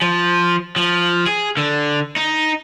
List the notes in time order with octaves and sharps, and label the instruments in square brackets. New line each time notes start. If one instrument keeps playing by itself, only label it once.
[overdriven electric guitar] F3
F3
G#4
D3
D#4